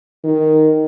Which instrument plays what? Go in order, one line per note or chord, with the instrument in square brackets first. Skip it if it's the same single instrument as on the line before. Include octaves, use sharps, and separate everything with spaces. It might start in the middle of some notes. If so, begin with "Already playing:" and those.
[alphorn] D#3